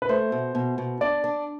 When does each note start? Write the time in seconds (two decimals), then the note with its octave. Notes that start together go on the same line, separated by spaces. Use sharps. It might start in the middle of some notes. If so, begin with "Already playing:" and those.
0.02 B4
0.09 A3 C5
0.32 B2
0.55 B2
0.78 B2
1.01 D4 D5
1.24 D4